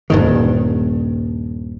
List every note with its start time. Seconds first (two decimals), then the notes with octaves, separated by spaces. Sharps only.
0.10 D#1 G2 D#3